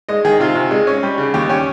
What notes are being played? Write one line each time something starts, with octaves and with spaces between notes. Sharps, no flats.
G#3 D#5
D#3 G#4
C3 F4
C3
G#3
C#4
G3
C#3
D#2 G4
C#4 G4